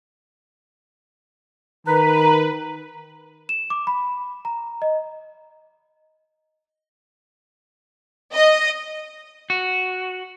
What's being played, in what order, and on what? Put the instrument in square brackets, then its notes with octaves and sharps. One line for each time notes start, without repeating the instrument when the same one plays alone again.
[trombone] D#3 [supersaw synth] B4 [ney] A#5
[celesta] E7
D6
B5
A#5
D#5
[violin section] D#5
[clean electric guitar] F#4